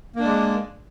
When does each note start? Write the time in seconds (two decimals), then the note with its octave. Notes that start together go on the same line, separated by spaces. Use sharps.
0.16 A#3
0.20 D4
0.24 G#3